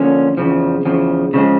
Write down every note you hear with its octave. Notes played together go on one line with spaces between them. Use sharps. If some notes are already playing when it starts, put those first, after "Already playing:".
Already playing: D3 F3 A#3 C#4
E2 C#3 F3
E2 C#3 F3
C#3 F3 G#3